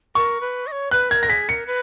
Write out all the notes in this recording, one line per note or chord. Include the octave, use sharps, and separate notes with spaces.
A#4 C#6
B4
D#5
C#5
B4 F#6
A#4 G#6
A#6
G#4 B6
A#4 C#7
B4